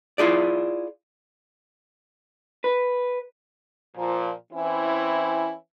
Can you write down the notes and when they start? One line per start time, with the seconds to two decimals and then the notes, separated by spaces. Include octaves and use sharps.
0.18 E4 F4 G#4 D5
2.64 B4
3.97 A#2 F3
4.53 E3 C4 C#4 E4